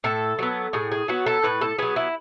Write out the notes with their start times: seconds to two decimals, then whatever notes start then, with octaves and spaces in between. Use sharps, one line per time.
0.04 A2 A4
0.39 F#3 B3
0.73 A2 G#4
0.91 G#4
1.08 F#3 B3 F#4
1.26 A4
1.44 A2 B4
1.61 A4
1.78 F#3 B3 G#4
1.96 E4